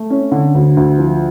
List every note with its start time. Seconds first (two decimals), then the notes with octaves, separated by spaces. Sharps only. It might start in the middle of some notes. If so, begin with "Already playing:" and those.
Already playing: A3
0.10 C#4
0.32 D3
0.54 D2
0.77 D2
0.98 F3